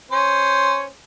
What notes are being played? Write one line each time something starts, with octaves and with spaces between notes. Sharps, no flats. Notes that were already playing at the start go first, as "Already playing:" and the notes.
C#4 C5